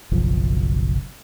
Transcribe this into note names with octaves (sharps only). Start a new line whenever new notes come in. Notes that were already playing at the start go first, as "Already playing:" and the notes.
F#1 B1 F3